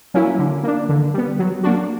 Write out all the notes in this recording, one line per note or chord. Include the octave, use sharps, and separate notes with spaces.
F#3 A#3 C#4 E4
D3
A#3 D4
D3
G3 B3
F#3
A#3 D4 F#4